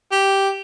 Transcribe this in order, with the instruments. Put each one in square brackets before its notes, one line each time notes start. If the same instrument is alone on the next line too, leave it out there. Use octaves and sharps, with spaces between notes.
[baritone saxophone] G4